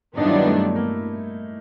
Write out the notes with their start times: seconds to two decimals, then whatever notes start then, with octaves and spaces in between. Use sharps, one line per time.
0.17 G2 D#3 F#3 B3 D4 D#4
0.26 E4
0.35 D#4
0.46 A3
0.75 A#3